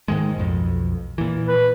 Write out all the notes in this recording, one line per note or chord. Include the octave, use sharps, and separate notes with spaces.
G#2 D#3 G#3
B1 F2
A#2 E3
B4